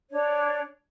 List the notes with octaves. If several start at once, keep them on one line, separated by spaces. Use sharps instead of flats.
D4 C#5